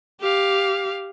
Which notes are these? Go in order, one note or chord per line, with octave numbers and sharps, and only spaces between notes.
G4 F5